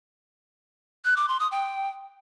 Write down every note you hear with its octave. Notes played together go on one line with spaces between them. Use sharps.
F#6
D6
C6
D#6
G5